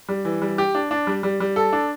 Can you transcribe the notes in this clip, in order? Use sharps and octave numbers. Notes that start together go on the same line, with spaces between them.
G3
E3
G3
G4
D4
D4
G3
G3
G3
A4
D4